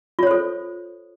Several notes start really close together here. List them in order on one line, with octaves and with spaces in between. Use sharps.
F4 C#5 C5 A4